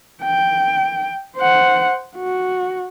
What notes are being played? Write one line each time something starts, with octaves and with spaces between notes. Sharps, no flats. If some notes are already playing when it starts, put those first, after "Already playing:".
G5
C5 F#5
F#4